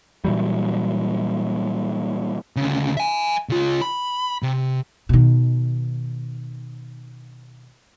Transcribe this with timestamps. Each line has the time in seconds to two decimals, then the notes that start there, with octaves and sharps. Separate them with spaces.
0.25 A#2 E3 F#3 G3
2.56 D2 C#3
2.97 E5 G#5
3.49 C#3 F4
3.82 B5
4.42 C3
5.09 B2 D#3